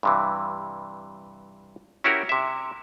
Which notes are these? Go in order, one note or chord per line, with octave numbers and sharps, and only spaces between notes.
G2 C3 E3
C#4 E4 F#4 G4 A#4
C3 E5